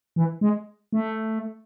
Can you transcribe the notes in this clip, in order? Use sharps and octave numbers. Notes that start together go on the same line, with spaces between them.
E3
G#3
A3